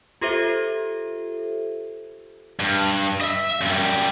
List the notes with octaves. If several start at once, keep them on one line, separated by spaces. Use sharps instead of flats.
F4 G4 A4 C5 E5
G2
D#5 E5
F#2 G3